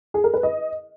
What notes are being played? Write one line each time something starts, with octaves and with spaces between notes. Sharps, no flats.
G#4
A#4
B4
D#5